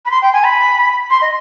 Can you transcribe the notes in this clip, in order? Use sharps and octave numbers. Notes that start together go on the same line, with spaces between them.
B5
C6
G5
G#5
B5
C6
D#5